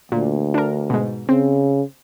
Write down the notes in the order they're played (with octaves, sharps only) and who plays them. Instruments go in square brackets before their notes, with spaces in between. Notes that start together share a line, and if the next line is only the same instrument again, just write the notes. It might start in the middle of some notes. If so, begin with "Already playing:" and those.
[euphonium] D2 [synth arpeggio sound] A#2
[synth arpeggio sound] D4 A#4
G#2 B2
[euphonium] C#3 [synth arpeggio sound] C4